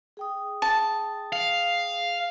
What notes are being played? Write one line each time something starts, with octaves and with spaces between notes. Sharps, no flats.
G#4 G5 D#6
A5
F5